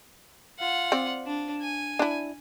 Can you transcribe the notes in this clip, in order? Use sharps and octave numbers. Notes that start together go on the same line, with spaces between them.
F4 F#5
C4 D5
D4
G#5
D4 E4